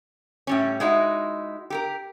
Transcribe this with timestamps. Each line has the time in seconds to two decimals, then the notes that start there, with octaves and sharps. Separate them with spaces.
0.47 A2 G3 C#4
0.80 G#3 D#4 E4 F#4
1.70 G4 A4 A#4